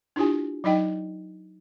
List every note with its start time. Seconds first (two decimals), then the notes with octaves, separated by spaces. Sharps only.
0.16 D4 E4 F4 G4 G#5
0.64 F#3 D#4 D#5 G5